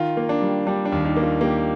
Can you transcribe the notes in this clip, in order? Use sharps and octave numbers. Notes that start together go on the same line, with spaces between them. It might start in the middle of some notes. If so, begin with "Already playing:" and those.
Already playing: D#3 F4
A#3
D4
G3
G3 D4
D4
D#2
D#4
A#3
F4
A#3 G4